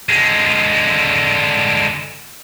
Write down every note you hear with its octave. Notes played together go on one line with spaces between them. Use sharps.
D3 G#3